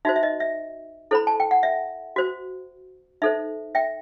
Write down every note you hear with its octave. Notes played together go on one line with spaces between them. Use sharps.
D#4 F#4 C5 E5
E5
D#5
E5
E4 A4 C5 B5
A5
G5
F#5
E5
F#4 C5
D#4 A4 C5 E5
E5 G5